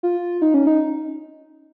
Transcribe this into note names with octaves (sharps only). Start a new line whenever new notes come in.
F4
D#4
C#4
D#4